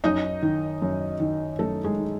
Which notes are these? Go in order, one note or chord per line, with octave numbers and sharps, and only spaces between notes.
F#2 D#4 D#5
D#3
F#2
D#3
F#2 A3 A4
G#3 G#4
D#3